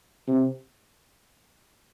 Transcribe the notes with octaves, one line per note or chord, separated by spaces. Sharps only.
C3